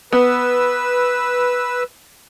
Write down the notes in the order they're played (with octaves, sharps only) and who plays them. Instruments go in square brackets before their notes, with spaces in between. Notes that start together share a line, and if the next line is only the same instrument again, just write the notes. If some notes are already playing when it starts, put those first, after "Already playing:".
[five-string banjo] B3 [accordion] B4 E6